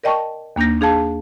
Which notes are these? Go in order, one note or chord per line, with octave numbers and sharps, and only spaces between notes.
A#4 D5 D#5 G5 A5 C#6
D#2 A#3 D4 G6 A#6
D4 G#4 F5 A5